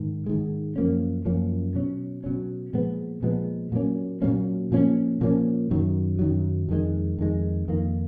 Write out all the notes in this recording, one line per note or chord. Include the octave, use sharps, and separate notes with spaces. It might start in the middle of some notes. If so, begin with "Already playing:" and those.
Already playing: G#2 D#3
G#2 D#3 G#3
F#2 F3 A#3 C#4
F#2 F3 A#3 C#4
B2 F#3 C#4
B2 F#3 C#4
A#2 F3 G#3 B3
A#2 F3 G#3 B3
A#2 F#3 A#3 C#4
A#2 F#3 A#3 C#4
A#2 F3 A#3 C#4
A#2 F3 A#3 C#4
F#2 D#3 F#3
F#2 D#3 F#3
F2 D#3 G#3
F2 D#3 G#3
F2 D#3 A#3